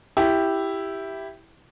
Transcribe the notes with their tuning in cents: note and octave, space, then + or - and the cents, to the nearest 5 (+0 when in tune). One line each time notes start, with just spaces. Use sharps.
E4 +0 G4 +0